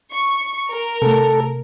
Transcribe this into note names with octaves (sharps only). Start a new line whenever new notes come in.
C#6
A#4
C3 A3 A4